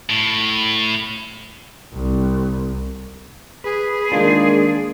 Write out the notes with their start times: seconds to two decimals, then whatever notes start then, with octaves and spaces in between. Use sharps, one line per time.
0.10 A2
1.93 C2
3.64 G#4 B4
4.12 D#3 G#3 A#3 D4 F4